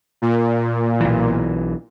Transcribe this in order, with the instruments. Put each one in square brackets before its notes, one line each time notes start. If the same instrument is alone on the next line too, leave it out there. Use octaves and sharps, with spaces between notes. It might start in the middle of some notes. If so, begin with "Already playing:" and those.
[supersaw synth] A#2
[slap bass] B1 E3